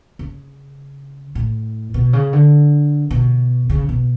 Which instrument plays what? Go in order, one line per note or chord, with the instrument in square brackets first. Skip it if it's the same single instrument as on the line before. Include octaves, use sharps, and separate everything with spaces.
[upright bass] C#3
A2
B2
C#3
D3
B2
C#3
B2